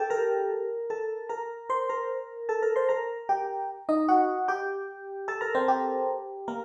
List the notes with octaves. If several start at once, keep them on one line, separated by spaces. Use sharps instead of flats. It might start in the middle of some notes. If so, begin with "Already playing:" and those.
Already playing: G4 A4 G5 A5
A#4 A#5
A4 A5
A#4 A#5
C5 C6
A#4 A#5
A4 A5
A#4 A#5
C5 C6
A#4 A#5
G4 G5
D#4 D#5
F#4 F#5
G4 G5
A4 A5
A#4 A#5
C4 C5
G4
A#3 A#4